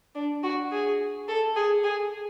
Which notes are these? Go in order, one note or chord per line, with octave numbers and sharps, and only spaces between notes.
D4
F#4
G#4
A4
G#4
G#4